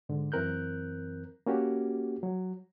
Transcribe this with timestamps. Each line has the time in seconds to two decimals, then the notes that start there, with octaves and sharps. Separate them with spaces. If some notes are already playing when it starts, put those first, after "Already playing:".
0.09 G#2 D3
0.32 F#2 E3 C4 A#4 F#6 G6
1.46 A#3 C#4 F#4 G4
2.23 F#3